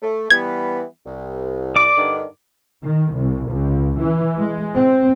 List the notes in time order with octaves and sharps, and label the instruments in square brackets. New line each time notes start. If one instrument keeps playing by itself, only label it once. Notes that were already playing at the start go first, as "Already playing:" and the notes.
[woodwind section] A3
[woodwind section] E3 G3 B3 [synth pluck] G#6
[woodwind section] C2
[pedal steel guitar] D5 D6
[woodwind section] G2 D3 D#3
[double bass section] D#3
C2
C#2
E3
G#3
C4